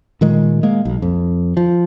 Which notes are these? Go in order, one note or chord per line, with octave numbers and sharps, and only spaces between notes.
A#2 D#3 G#3
G#3 A#3
B1
F2
F3